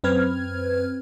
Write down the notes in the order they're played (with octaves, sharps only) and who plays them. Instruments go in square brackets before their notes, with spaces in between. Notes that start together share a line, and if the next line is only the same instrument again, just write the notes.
[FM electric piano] F#2 C4 B4 F6 G#6